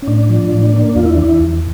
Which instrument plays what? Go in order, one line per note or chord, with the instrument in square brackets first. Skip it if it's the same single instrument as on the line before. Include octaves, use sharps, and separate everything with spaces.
[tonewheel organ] C#4
A2 D4
F3
A2
A#3
E2 F4
E4
E3 D4
E4
E2